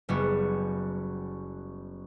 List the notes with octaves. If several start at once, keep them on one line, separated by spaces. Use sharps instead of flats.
F#1 G3 B3 F#4